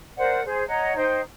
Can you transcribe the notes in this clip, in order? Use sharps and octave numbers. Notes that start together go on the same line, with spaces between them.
A#4 C5 D5 F#5
G#4 C5
C#5 D#5 F#5 A#5
D#4 C5 G5